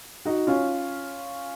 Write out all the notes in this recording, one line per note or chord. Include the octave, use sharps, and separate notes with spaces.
D#4 F#4
C#4 F4